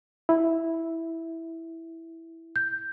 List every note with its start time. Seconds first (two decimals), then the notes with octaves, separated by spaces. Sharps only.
0.29 E4
2.56 G6